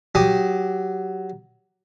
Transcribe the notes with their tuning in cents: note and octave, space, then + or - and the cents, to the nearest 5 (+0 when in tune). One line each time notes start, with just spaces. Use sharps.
F#3 +10 G4 +0 D#6 +0